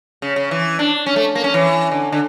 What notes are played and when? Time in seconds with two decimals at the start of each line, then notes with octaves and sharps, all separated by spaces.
0.22 C#3
0.36 C#3
0.51 E3
0.79 D4
1.06 C#4
1.16 A3
1.35 A#3
1.44 C#4
1.54 E3
1.92 D3
2.12 D3